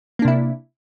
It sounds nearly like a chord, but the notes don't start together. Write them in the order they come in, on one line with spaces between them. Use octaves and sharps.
A#3 D4 C3 E4